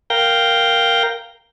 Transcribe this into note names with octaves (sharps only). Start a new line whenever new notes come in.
A#4 F5 G5 G6 A#6